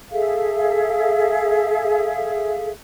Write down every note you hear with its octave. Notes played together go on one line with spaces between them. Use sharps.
G#4 A4 E5 F5